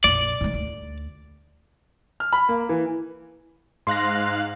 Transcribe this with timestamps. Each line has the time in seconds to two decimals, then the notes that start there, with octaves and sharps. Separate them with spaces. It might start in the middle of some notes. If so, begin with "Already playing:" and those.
0.04 A#1 F2 D5
0.41 G#2 D#3
0.54 D2
2.20 F6
2.33 B5
2.49 A#3
2.69 E3
3.87 G#2 F5 C6 F#6 A#6